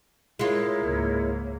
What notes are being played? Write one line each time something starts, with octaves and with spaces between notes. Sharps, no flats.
G#3 E4 F4 A#4 C#5
C#2 G#2 A#3